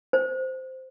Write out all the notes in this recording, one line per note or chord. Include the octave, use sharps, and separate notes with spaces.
C5